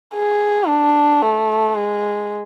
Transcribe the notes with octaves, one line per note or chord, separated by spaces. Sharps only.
G#4
D4
A3
G#3